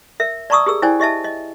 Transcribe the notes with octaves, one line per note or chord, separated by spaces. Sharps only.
A#4 E5
D5 A5 A#5 C#6 D#6 E6
G4 G#4 A#4 E6
E4 C5 D5 G5 G#5
G4 D#5 E5 A5
D#5